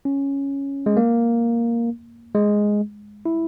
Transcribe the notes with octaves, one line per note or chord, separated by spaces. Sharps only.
C#4
G#3
A#3
G#3
E4